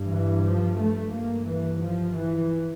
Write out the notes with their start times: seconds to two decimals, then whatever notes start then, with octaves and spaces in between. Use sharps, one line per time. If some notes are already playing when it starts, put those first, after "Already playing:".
Already playing: G2
0.09 E3
0.43 F3
0.78 A3
1.13 G2 A#3
1.47 E3
1.82 F3
2.15 E3